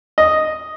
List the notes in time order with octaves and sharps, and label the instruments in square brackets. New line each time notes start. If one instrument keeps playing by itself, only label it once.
[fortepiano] D#5